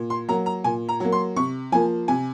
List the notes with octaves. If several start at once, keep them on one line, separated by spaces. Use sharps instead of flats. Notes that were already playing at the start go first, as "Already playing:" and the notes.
Already playing: A#2
C6
F#3 A#3 A#5
A#5
A#2 G#5
A#5
F#3 A#3
C6
C3 C#6
F3 A#3 G#5
C3 G#5